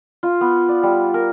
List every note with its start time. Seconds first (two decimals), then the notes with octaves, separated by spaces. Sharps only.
0.23 F4
0.41 B3
0.69 D5
0.83 G3
1.14 A#4